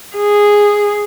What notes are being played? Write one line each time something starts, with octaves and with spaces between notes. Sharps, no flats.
G#4